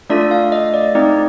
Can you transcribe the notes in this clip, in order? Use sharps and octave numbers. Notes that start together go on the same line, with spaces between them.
A3 D4 F4 A4 D5
F5
D#5
D5
A3 C4 D#4 D5